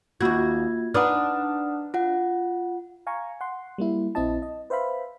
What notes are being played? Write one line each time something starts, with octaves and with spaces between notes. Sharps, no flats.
D#2 A#3 F4 F#4 G#6
D4 D#4 B4 F#5 D#6 F6
F4 F#5
F5 G#5 A#5 C#6
F#5 C6
G3 A#3 E4
A#1 C4 E4 D#5 A5
D#5
B4 C5 E5 F5 B5